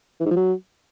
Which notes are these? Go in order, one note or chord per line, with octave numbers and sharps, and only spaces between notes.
E3
G#2
F3
F#3